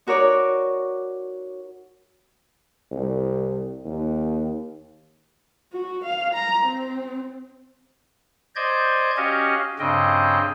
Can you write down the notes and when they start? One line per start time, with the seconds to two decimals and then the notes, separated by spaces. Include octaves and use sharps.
0.07 D#4 F#4 A#4 C#5 D5
2.92 C2
3.85 D#2
5.73 F#4
6.05 F5
6.35 A#5
6.66 C4
8.56 C5 D5 D#5 G6 G#6
9.17 C#4 F#4 G4 D#5 F5
9.79 G2 C#3 C4 D#5 G5